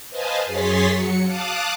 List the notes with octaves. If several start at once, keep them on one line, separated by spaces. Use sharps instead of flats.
B4 C5 D#5 F5 G#5 A5
F#2 G#4 C#5 C6 A6 B6
F#3 C#7
F5 A5 D6 D#6 F#6